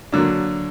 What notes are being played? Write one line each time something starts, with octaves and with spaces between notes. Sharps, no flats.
D3 F#3 A#3 D4